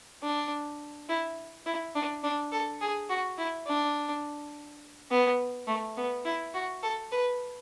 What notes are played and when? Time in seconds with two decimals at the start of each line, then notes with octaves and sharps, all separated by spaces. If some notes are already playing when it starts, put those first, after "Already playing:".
0.23 D4
1.09 E4
1.66 E4
1.95 D4
2.23 D4
2.52 A4
2.81 G#4
3.10 F#4
3.38 E4
3.67 D4
5.11 B3
5.67 A3
5.97 B3
6.25 E4
6.54 F#4
6.83 A4
7.11 B4